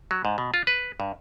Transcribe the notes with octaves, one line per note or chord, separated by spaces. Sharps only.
F#3
G#2
B2
F4
B4
G2